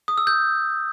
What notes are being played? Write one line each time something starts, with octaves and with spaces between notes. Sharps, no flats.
D#6
E6
G6